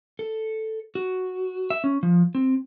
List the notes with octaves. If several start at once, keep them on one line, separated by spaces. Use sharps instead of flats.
A4
F#4
E5
C#4
F3
C4